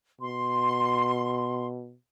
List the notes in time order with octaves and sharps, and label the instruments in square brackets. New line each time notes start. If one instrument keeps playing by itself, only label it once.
[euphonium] B2 [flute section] C6